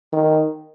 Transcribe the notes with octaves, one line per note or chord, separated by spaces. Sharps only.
D#3